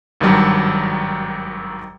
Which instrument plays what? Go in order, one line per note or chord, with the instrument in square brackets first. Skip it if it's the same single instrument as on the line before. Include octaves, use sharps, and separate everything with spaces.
[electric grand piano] G#1 G2 D#3 F#3 G3